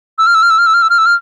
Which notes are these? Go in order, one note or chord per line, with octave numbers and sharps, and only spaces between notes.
E6
F6
E6
F6
E6
F6
E6
F6
E6
F6
E6
F6